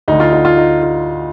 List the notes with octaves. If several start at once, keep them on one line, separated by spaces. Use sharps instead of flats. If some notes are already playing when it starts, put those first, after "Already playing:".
D2 D3 D#4
F4
D#4
F4
D#4
F4